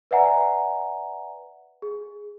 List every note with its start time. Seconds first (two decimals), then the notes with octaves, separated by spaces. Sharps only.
0.11 B4 D5 E5 F#5 G#5 A#5
1.82 G#4